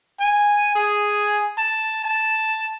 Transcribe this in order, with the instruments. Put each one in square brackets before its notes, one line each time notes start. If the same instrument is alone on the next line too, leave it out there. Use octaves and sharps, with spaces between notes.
[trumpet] G#5
G#4
A5
A5